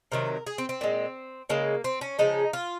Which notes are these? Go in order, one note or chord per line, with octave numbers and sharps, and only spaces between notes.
C3 D#3 F#3 A#4
G#4
C4
C4
A#2 G#3
C#3 G#3 A#3
C4
C#4
C#3 F3 G#3 D#4
F4